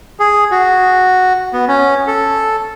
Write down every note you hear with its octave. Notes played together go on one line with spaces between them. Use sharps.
G#4
F#4
B3
C#4
A4